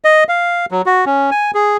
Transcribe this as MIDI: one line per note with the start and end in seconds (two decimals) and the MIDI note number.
0.05 0.24 75
0.29 0.66 77
0.71 0.82 54
0.86 1.05 66
1.06 1.30 61
1.31 1.51 80
1.55 1.77 68